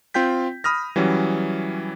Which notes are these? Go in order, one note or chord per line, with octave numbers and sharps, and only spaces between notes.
C4 F4 G5 G6 B6
B5 D#6 F6 A#6
E3 F#3 G3 C#4